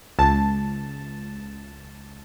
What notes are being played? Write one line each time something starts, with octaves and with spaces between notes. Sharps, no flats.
C#2 A5